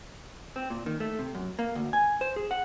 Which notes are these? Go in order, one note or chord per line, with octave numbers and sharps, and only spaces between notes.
C4
A#2
D#3
A3
C3
F#2
A#3
D2
G#5
C5
G#4
F#5